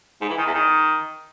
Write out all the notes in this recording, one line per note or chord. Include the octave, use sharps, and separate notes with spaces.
G#2
E3
D#3
E2
D#3